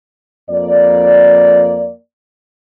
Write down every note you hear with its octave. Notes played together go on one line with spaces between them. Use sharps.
F2 A#3 D5